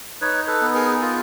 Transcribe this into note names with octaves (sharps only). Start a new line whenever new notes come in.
D#4 B4 C#5
A4 B4
B3
G#4 A#4
F4 G#4 A#4